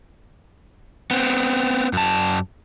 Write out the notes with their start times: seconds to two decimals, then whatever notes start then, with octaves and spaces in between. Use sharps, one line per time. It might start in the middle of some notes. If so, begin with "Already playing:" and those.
1.11 B3 C4
1.93 F#2 A5